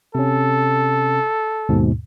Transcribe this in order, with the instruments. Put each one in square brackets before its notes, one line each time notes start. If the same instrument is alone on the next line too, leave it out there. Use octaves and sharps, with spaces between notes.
[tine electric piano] C3 C#4 [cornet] A4
[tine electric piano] D#2 G#2 B2